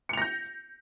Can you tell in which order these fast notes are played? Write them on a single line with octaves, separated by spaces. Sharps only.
C#7 F7 A#6 G6